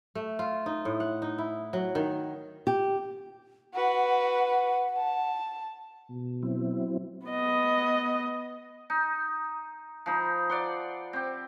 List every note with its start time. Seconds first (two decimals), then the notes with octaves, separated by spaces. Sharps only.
0.15 A3
0.39 F4
0.66 D#4
0.85 A2
1.00 F#5
1.22 D#4
1.38 E4
1.73 F#3
1.95 D#3
2.67 G4
3.74 F#4 B4 F#5
4.97 A5
6.10 B2
6.43 F#3 C4 E4
7.27 B3 D#5
8.90 D#4
10.06 F3 D#4 B5
10.50 D5 F#5 C6
11.13 C4 G4